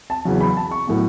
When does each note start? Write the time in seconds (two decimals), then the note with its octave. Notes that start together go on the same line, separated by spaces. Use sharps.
0.10 A5
0.25 E2 C#3 F#3
0.41 B5
0.57 A5
0.71 C#6
0.87 A2 F#3 B3